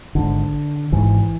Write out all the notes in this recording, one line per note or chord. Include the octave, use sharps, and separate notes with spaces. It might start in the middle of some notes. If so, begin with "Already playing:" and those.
G#1 G#2 D3
G#1 G#2 E3